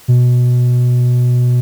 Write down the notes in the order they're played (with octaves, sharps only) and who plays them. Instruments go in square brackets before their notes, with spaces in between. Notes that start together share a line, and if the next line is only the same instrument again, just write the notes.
[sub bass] B2